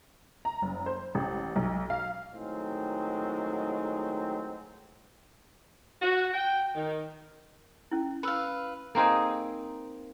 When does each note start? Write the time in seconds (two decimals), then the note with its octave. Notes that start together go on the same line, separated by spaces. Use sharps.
0.45 A#5
0.62 F#1
0.86 C5
1.15 A1
1.56 B1
1.90 F5
2.33 A2 D#3 F#3 G#3 C4
6.02 F#4
6.34 G5
6.75 D#3
7.91 C#4 E4
8.23 B4 F5 B5 E6
8.95 A#3 C4 D#4 G#4